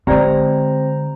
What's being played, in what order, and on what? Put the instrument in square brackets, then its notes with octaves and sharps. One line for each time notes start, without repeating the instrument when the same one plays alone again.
[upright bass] D3 G#3 [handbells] C4 C5 [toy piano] G4 D5 [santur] A#5